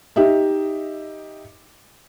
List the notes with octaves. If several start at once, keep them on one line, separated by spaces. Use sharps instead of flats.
D#4 G4 D#5 E5